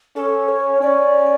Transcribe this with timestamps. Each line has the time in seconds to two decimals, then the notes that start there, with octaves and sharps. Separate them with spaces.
0.16 C#4 A4
0.48 C#5
0.81 C#4 D5